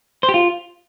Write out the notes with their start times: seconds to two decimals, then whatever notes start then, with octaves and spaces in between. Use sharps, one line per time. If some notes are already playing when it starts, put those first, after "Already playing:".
0.23 C5
0.29 G4
0.34 F4